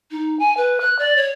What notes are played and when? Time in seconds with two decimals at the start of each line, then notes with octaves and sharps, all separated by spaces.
0.11 D#4
0.39 G#5
0.57 B4
0.80 F#6
0.99 D5
1.17 C#5